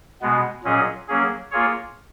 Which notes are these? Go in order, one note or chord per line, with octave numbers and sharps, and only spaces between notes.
B2 G#3 B3
A#2 F#3 C#4 G#4 D#5
F#3 A#3 C#4 G#4
A#3 F4 G#4 C#5